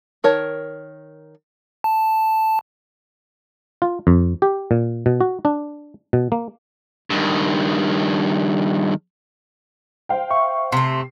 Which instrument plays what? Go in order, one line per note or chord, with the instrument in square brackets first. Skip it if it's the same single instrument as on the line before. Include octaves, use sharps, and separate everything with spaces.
[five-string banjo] D#3 A#4 C#5 A5
[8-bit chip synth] A5
[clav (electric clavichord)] F4
F2
G4
A#2
B2
F#4
D4
B2
A#3
[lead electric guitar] G2 D#3
[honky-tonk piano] C5 F5 G5
[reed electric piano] E5 C#6
[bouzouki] C3 A3 [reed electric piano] C6 [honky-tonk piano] C7